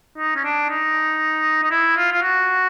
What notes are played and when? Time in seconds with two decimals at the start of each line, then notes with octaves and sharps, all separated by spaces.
0.19 D#4
0.36 C#4
0.44 D4
0.70 D#4
1.62 D#4
1.71 E4
1.97 F4
2.12 F4
2.22 F#4